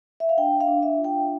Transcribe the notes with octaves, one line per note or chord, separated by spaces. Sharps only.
E5
F5
D4 G5
F5
D4
E5
F4
G5